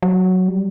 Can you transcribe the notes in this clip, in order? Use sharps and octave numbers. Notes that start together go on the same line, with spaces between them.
F#3
G3